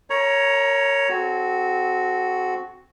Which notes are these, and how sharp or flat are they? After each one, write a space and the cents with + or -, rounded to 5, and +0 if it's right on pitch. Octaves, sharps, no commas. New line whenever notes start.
A#4 -30 C#5 +5 A#5 +25
C4 -5 F#4 +0 A4 -35